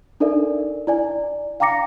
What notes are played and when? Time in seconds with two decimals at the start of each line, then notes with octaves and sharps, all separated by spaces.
0.20 D4 D#4 A4 A#4 D5 E5
0.87 E4 D5 G#5
1.60 F5 G5 A#5 D6 A#6 C#7